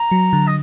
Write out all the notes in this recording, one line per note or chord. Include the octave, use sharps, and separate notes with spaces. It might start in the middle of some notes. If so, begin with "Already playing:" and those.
Already playing: A#5
F#3
D3
D#5